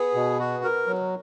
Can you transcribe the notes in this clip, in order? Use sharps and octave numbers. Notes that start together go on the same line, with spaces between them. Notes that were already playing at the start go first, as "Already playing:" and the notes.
Already playing: B3 G#4
B2
F#4
A#4
F#3